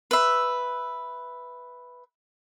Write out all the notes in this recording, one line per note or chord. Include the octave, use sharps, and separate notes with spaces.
B4 E5